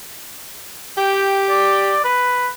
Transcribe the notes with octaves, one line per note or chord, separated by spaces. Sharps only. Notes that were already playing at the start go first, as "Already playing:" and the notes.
G4 G5
D5
B4